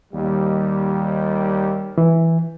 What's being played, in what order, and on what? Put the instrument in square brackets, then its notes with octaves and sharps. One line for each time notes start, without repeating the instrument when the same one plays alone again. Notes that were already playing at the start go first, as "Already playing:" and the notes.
[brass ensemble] D#2 G3
[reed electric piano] E3